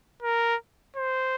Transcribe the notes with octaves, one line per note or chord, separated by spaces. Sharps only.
A#4
C5